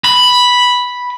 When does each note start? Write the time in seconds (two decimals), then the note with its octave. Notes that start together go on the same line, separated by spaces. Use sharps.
0.04 B5